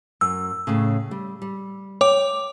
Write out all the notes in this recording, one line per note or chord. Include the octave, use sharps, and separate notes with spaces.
F#2 E6
A2 C#3
G3
G3
C#5 G5 D6